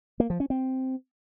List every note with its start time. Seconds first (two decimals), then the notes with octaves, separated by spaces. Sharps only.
0.20 A#3
0.30 F3
0.40 C#4
0.50 C4